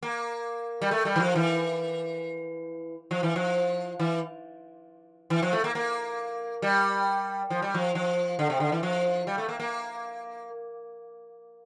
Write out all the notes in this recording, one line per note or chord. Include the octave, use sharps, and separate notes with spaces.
A#3
G3
A3
G3
E3
F3
E3
F3
E3
F3
E3
E3
F3
A3
A#3
A#3
G3
F3
G3
F3
F3
D3
C3
D3
E3
F3
G3
A3
A#3
A#3